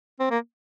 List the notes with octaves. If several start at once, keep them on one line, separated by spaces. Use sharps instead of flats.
C4
A#3